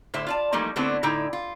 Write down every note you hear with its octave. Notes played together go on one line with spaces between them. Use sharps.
A2 D3 C5 E5
F4 D5 A5
E3 F3 G3 A3 A#3 D#4
D3 A3 B3 C4 D4 E4
A2 D3 D#4 E4 G5
F4